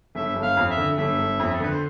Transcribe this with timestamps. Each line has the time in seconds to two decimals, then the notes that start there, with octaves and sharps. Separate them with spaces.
0.15 G1 E5
0.36 G1
0.43 F5
0.57 F2
0.70 E5
0.77 D3
0.98 G1 E5
1.18 G1
1.39 F2
1.53 A4
1.60 D3 B4
1.71 C5